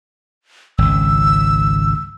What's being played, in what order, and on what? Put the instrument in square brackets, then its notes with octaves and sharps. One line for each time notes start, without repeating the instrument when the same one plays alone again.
[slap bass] G#1 C#2 [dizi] E6